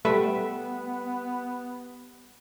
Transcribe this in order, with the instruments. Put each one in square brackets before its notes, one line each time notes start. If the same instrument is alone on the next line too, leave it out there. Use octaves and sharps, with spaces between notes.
[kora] G3 E5 [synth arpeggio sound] A3 A4 B4 [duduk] B3